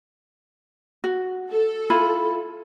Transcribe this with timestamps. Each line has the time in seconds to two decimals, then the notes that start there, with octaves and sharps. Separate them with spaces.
1.04 F#4
1.51 A4
1.90 E4 F4 B5